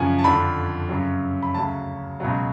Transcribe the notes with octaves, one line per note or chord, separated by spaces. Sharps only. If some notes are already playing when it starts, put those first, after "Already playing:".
Already playing: F#2 C#3 F3 F#5 G#5
A5
F2 D3 F3 B5
F#2 C#3 F#3
B5
D2 C#3 F#3 A5
C#2 B2 F#3